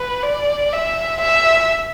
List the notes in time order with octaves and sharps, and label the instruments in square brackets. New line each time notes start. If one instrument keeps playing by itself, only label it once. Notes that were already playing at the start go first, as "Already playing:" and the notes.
Already playing: [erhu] B4
D5
E5
E5